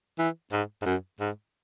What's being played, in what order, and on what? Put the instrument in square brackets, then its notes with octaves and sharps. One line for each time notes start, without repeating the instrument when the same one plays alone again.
[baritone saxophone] E3
G#2
G#2
F#2
G#2